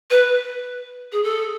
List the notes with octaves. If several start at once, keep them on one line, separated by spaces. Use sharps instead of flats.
B4
G#4
A4